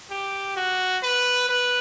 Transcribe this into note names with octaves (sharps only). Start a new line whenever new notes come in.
G4
F#4
B4
B4